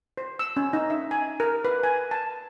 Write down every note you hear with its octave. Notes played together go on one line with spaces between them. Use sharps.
C5
E6
C#4
D#4
E5
G#5
A#4
B4
G#5
A5